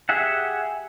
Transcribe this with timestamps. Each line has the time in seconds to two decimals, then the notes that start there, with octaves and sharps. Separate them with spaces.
0.09 G4 G#4 E5 F#5